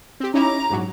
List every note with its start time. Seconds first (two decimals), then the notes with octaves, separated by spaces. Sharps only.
0.20 C4 G4
0.34 C#4 D#4 E4 A#5 D6
0.70 A#1 G#2 F#3